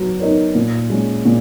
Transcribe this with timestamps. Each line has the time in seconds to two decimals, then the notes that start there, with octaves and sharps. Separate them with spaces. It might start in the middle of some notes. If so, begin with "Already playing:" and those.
Already playing: F#3 B3
0.20 B3 D#4 A#4 C#5
0.55 A#2
0.90 G#3 C#4
1.25 A#2